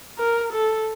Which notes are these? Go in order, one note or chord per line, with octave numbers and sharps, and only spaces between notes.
A#4
A4